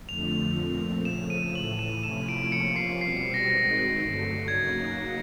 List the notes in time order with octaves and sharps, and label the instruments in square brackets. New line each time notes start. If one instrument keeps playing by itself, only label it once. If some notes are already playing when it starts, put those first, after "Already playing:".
[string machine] F2 D3 F3 A3 [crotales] F7
[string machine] A#2 F3 A3 C4
[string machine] C#3 F3 A3 [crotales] E7
[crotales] D#7
[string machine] A2 E3 A3 [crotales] F#7
[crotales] E7
[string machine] C3 F3 A3 C#4 E4 [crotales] E7
[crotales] D7
[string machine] C3 F3 A#3 C#4 F4 [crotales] C#7
[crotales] C7
[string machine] B2 G3 C4 [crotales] C7
[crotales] C7
A#6
[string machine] D#3 G#3 C4 D#4 F#4 [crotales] A#6
[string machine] G2 D3 F#3 A3
[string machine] C#3 F#3 A#3 D#4 F#4 [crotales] G#6